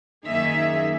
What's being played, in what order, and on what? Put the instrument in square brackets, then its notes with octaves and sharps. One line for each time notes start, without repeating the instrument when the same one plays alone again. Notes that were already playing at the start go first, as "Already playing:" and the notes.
[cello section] F#2 D#3 A#3 D#4 G#4 E5